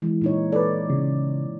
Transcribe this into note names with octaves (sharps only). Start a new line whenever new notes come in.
E3 G#3
A#2 D#4 C#5
A4 B4 D5
C#3